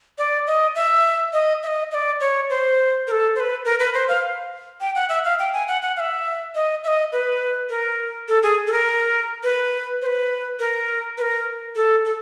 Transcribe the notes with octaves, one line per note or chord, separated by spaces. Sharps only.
D5
D#5
E5
D#5
E5
D#5
D#5
D5
C#5
C5
A#4
A4
C5
B4
A#4
B4
C5
F5
G5
F#5
E5
F5
G5
G#5
F#5
F#5
F5
E5
D#5
E5
D#5
B4
A#4
A4
G#4
A4
A#4
B4
C5
B4
A#4
B4
A#4
A4
A4